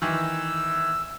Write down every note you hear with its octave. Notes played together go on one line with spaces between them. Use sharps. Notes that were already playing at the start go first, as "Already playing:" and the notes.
D#3 E3 E6